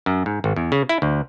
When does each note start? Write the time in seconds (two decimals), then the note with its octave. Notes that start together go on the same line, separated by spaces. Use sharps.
0.06 F#2
0.26 G#2
0.44 G#1
0.56 E2
0.72 C#3
0.89 E4
1.02 D2